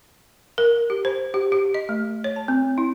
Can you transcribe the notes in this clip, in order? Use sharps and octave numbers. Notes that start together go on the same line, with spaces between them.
A#4
G4
C5
G4
G4
D#5
A3
C#5
A5
C4
E4